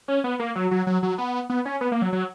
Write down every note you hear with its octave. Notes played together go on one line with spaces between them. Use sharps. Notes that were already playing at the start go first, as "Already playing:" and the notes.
C#4
B3
A#3
F#3
F#3
F#3
F#3
B3
B3
C#4
B3
A#3
F#3
F#3